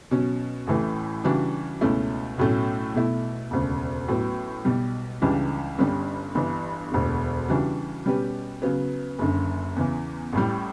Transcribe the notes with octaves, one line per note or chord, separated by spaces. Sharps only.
B2 F#3 C#4
A1 A2 E3 A3
C#3 E3 G3 D4 F#4
C#2 B2 A3 C#4 E4
B1 A2 F#3 A3 C#4
B1 B2 A3 E4
E1 D2 C#3
A1 A2 F#3 B3
B1 B2 G3
C#2 C#3 E3 G3 D4
G1 G2 D3 G3 C#4
G1 G2 E3
E1 D2 D3
C#3 E3 G3 D4 F#4
B2 G3 C#4 G4 B4
C#3 F#3 B3
F#1 F#2 D3
E2 C#3 E3
A1 A2 G3